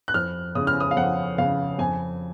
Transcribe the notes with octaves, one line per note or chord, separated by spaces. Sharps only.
F#6
F2 F6
C#3 D#6
F6
D#6
F5
F2 F#5
C#3 F5
F2 G#5